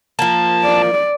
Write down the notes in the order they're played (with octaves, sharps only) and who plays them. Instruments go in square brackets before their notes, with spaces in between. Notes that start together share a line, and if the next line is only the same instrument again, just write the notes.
[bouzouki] F3 A#3 [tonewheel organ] A5
[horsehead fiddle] D5